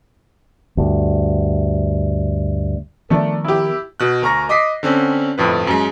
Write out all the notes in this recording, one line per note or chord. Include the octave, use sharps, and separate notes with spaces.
D2 G2
D#3 F3 A3 B3 D4 A#4
E4 G4
B2 F#6
D2 A#4 A#5 C#6 A#6
D#5 D6 D#6 B6 C7
D3 C4 C#4
G1 F2 A2 B4
F#2 G#3